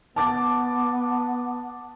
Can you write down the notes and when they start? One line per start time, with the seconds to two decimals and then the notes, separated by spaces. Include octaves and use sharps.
0.16 B3 A5 D6 A6